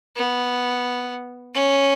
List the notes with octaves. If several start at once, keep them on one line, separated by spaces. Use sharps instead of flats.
B3
C#4